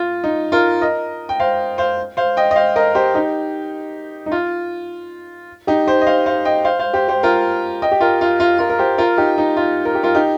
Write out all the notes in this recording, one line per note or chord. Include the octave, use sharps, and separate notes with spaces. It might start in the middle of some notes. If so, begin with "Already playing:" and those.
Already playing: F4
D#4
F4 A#4
A#4 D#5
G5
C5 F5
C5 F5
C5 F5
D#5 G5
D#5
C5 F5
A#4 D#5
G4 C5
D#4 G4
D#4
F4
D#4 G4
G4 C5
D#5
C5 F5
C5 F5
D#5 G5
C5 F5
C5 F5
G4 C5
G4 C5
F4 A#4
D#5 G5
G4
F4 A#4
F4
F4
F4 A#4
A#4
G4 C5
F4 A#4
D#4 G4
D#4
F4
A#4
G4
F4 A#4
D#4 G4